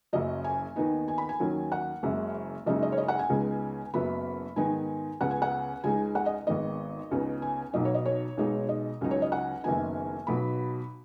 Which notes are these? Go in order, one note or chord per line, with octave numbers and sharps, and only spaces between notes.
F#1 F#2 C#3 F#3 D#5
G#5
D#2 D#3 B3 D#4
G#5
B5
G#5
D#2 D#3 F#3 C#4
F#5
F#1 F#2 C#3 G#3
F#1 F#2 C#3 G#3 D#4 D#5
D#5
C#5
D#5
F#5
G#5
C#2 C#3 G#3 B3 D#4
F#1 F#2 F#3 B3 B5
G#2 D#3 B3 D#4 G#5
C#2 C#3 B3 F#5
G#5
F#5
C#2 C#3 G#3 D#4 G#5
F#5
D#5
G#1 G#2 D#3 B3 D#5
C#2 C#3 B3 D#4
G#5
B1 B2 F#3 D#4 D#5
C#5
D#5
C#5
B1 B2 G#3 D#4
D#5
C#2 C#3 F#3 D#4
C#5
D#5
F#5
F#1 F#2 D#3 B3 D#4 G#5
B1 B2 F#3 B5